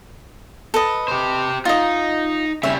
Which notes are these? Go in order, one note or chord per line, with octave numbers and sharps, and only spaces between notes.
A4 B4 D#5
G4 C5
D#4 F4 D#5
C#3 G3 C#5 E5